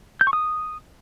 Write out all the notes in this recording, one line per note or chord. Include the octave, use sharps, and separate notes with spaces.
G6
C#6
D#6